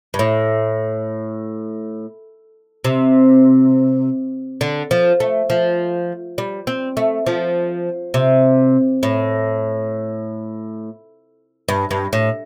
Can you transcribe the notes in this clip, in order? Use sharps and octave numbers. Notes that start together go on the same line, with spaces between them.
G2
A2
C3
D3
F3
A3
F3
G3
C4
A3
F3
C3
A2
G2
G2
A2